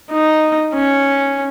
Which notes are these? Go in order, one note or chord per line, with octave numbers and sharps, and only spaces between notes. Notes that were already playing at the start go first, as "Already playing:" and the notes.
D#4
C#4